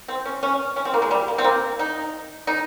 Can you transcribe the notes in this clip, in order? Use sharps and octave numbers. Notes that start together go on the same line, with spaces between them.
C4
C#4
C#4
C#4
C4
A#3
G#3
G3
A#3
C4
A#3
D#4
D#4